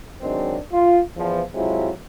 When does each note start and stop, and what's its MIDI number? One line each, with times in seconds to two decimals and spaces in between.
0.21 0.56 51
0.21 0.56 54
0.21 0.56 56
0.21 0.56 60
0.21 0.56 62
0.72 1.00 65
1.17 1.41 40
1.17 1.41 53
1.54 1.90 48
1.54 1.90 54
1.54 1.90 56
1.54 1.90 64
1.54 1.90 65